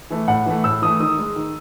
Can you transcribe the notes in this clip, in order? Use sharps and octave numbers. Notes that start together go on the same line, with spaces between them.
E3 A3
A2 F#5
E3 A3
A2 E6
E3 A3 D#6
D#3 D#6
G#3
D#3